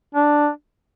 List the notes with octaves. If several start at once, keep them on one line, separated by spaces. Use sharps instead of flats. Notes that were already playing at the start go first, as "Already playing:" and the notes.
D4